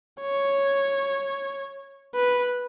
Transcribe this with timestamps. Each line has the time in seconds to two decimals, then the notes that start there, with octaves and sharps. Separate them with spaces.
0.21 C#5
2.15 B4